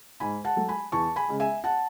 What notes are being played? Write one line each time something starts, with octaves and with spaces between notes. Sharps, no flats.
G#2 G#5 B5
F#5 A5
F#3 A3
G#5 B5
E2 A5 C#6
G#5 B5
C#3 G#3
E5 G#5
F#5 A5